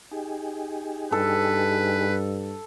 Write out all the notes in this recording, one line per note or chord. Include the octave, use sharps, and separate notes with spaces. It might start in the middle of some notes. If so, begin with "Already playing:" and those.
D#4 G4 G#4
G2 A4 B4